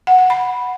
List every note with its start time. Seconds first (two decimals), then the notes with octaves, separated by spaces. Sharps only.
0.07 F#5
0.19 F#5
0.30 B5